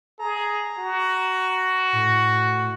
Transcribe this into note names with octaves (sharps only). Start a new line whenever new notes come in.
G#4 A#5
F#4
A2